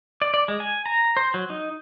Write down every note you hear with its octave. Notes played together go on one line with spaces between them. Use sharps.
D5
D5
G#3
G#5
A#5
C5
F#3
D#4